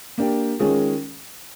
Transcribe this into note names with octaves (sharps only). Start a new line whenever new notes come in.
A#3 D4 G4
D#3 G#3 C#4 F4 G#4